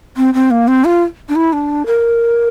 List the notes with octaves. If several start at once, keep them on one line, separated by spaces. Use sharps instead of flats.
C4
C4
A#3
C4
F4
D4
E4
D4
A#4